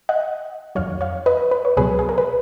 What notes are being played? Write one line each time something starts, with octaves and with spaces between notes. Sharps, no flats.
D#5 F#5
F2 D#3 F#3 C#5 F5
C#5 F5
B4 D#5
B4
C#5
C#2 B2 F#3 G#4 B4
G#4
A#4
B4